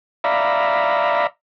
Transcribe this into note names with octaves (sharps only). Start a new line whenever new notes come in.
D5 E5 F5 A#5 B5